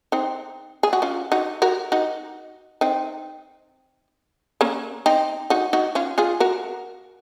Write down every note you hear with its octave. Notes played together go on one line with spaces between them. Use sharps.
C4 D#4
G#4
F#4
C#4 F4
D#4 F#4
F#4 A#4
D#4 F#4
C4 D#4
A#3 C#4
C4 D#4
D#4 F#4
D#4 F#4
C#4 F4
F4 G#4
F#4 A#4